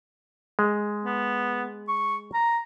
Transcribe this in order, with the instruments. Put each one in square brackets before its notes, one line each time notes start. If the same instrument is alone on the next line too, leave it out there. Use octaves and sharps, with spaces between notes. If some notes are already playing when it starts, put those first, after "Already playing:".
[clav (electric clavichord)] G#3
[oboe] B3
C#6
A#5